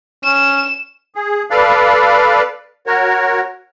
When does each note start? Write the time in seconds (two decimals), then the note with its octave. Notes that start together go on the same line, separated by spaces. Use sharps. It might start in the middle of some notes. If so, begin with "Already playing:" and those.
0.24 C#4 E7
1.15 G#4
1.51 A4 B4 D5 F5
2.87 F#4 A#4 C#5